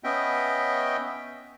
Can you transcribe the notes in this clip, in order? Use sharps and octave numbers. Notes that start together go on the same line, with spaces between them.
B3 C#4 D#5 E5 G5